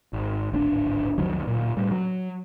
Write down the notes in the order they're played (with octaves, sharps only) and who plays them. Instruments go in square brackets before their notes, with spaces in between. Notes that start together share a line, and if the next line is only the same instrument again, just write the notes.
[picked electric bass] G#1
D1 G#1 C4 D4
C2 F2 D#3 F#3
D1 A#2
A2 G3
F#3